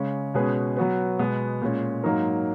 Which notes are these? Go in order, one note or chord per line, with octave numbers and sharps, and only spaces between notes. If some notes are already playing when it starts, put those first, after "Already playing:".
Already playing: C#3 G#3 C#4
B2 G#3 C#4 G#4 B4
F#3 B3 F#4 B4
B2 G#3 B3
A#2 G#3 C#4
G#2 F#3 A#3 D#4 A#4